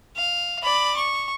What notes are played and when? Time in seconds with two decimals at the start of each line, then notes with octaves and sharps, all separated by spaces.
0.17 F5
0.63 D5 B5
0.96 C#6